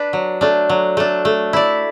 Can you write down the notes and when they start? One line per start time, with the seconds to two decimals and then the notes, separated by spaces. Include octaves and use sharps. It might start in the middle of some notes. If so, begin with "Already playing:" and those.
Already playing: D4 B4
0.13 F#3
0.41 A3 D4
0.69 F#3
0.97 A3 D4
1.25 A3
1.53 E4 D5